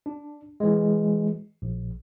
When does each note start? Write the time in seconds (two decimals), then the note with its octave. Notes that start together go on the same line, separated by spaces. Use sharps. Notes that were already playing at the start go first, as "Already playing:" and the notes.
0.06 D4
0.60 E3 G#3
1.62 A#1